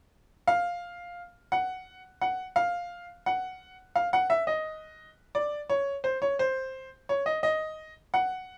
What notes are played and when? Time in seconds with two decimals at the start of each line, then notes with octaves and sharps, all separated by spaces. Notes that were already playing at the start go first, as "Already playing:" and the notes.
0.47 F5
1.52 F#5
2.21 F#5
2.56 F5
3.26 F#5
3.96 F5
4.13 F#5
4.30 E5
4.47 D#5
5.35 D5
5.70 C#5
6.04 C5
6.22 C#5
6.39 C5
7.09 C#5
7.26 D#5
7.43 D#5
8.14 F#5